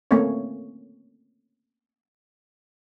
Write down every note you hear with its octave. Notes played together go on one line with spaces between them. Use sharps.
A3 A#3 C4 C#4 C#5